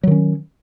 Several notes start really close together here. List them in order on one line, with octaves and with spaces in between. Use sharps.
F#3 D#3 C#4